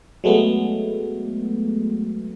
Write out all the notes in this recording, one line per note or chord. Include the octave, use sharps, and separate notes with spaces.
F#3 G#3 A3 B3